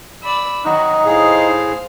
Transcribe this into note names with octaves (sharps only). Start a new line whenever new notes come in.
D5 B5 E6
D#3 F#3 D#4 F#4
A2 G#4 C5 F5